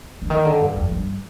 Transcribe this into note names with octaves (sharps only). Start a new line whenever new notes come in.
D3
D#3
D3
G2
F2
G2